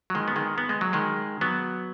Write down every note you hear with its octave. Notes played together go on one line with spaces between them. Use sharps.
F#3
D#3 G#3
B3
D#3 G#3
B3
G#3
F#3
D#3 G#3
F#3 B3